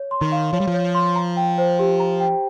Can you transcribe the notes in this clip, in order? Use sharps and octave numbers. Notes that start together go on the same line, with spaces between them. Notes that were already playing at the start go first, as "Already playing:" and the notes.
Already playing: C#5
C6
D#3
F5
F3 C#5
G3
F3
C#5
C6
A#5
G5
C5
G4
A#5
G5